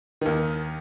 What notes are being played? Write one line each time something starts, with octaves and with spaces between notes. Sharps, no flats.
D#2 D#3